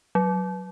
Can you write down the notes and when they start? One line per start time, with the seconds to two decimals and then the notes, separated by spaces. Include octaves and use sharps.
0.15 F#3